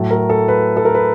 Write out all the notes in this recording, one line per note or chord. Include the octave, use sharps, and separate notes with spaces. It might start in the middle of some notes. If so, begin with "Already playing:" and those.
Already playing: A2 F#3 A3
A#4
A4
B4
A4
A#4
B4